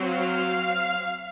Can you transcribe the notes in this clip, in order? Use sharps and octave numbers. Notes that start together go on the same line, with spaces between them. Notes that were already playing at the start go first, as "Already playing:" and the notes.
Already playing: F#3 C4
F5